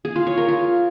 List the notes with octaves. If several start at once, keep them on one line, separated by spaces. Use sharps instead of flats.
G#4
F4
C#5
A#4
F4